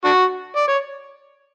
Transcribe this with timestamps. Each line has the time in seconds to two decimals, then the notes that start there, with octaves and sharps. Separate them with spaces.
0.05 D4 F#4
0.57 D5
0.68 C#5